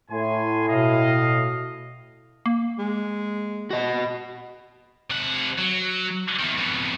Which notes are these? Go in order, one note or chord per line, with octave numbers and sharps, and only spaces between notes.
A2 G#5 C6
B2 D#5 F5
A#3
G#3
F#4 D#5
C3 F#5
F#3
E2 D#3
F2 B2